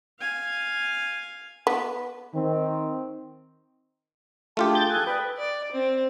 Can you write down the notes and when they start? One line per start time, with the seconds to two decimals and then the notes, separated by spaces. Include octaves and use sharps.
0.19 F5 G#5
1.67 B3
2.35 D#3 C4
4.57 A3 D4 F4 G4 G#4 A5
4.75 G5 G6 A6
4.89 A4 G#5 D#6 F#6
5.07 B4 D5 G5 D#6
5.37 D5
5.72 C4